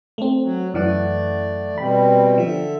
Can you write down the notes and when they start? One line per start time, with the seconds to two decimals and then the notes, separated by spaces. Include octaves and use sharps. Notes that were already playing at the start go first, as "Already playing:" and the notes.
0.18 A3 C4
0.42 F#3
0.74 F#2 E3 A3 D5 F#5
1.78 B2 G3 C4 B5
2.38 D3 F3 E5